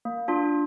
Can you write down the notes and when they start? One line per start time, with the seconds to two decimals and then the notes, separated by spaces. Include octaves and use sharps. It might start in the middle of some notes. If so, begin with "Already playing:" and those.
0.05 A#3
0.28 D4 F4